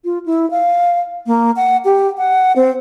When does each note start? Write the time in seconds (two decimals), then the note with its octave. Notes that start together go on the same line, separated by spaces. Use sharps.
0.05 F4
0.26 E4
0.51 F5
1.27 A#3
1.56 F#5
1.85 G4
2.18 F#5
2.56 C4